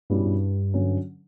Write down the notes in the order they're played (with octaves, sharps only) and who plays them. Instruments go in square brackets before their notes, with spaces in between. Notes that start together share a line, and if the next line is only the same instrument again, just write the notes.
[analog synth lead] G2 [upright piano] B2 G3 C#4 E4
[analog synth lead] G2
[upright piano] D3 F#3 C#4